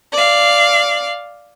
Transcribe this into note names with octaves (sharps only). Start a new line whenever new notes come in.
D5 F5